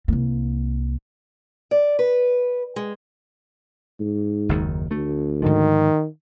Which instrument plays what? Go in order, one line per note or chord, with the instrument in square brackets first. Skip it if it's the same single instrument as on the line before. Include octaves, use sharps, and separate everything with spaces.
[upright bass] C2 A#3
[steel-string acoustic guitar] D5
B4
G#3
[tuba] G#2
[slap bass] F#1 D#2 D#3
[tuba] D2 [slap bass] A3
[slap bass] G#2 D3 F3 [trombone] D#3